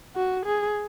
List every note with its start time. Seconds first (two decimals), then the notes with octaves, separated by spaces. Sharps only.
0.16 F#4
0.46 G#4